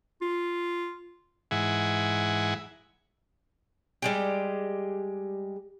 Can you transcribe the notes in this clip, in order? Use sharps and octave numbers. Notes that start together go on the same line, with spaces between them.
F4
G#2 E3 E5 F#5 G#5
G3 G#3 G4